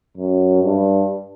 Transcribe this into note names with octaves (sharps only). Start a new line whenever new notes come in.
F#2
G2